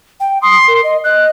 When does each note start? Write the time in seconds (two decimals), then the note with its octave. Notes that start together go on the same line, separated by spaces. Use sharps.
0.20 G5
0.42 C6 D#6
0.68 A#4
0.84 D#5
1.04 D#5 F#6